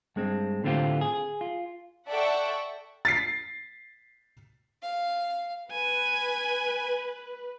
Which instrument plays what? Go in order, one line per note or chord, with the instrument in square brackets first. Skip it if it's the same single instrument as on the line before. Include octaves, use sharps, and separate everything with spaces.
[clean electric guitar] G2 G#3 C4
A2 D3 A3 C4 F4 G4
G#4
F4
[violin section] A4 D5 E5 F#5 G5 C#6
[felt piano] A6 B6 C7
[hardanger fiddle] F5
[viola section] B4 [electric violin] G#5